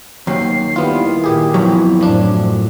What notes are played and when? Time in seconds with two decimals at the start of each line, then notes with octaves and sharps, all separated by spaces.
0.27 D#2 F#3 G5 C7
0.76 D#3 G3 B3 E4 F4
1.24 A#2 G4 G#4
1.54 F2 F#3 B3
2.01 F#2 A2 F3 D4